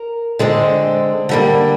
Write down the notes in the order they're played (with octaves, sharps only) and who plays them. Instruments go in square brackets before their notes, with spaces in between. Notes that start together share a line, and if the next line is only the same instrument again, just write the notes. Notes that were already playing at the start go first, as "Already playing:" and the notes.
Already playing: [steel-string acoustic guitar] A#4
D3 G#3 C4
D3 G3 A#3